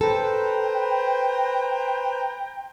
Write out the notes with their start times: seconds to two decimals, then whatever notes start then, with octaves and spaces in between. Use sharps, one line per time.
0.01 A4 B4 C5 G5 A#5